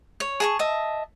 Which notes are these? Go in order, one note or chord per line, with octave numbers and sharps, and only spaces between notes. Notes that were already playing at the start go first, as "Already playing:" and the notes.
C#5
G#4 A5 C#6
D#5 E5 A5